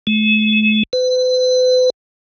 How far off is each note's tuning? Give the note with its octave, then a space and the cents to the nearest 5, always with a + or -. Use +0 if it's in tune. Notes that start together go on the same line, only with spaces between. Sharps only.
A3 -40
B4 +45